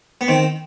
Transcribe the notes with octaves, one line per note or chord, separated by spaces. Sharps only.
B3
D#3 C4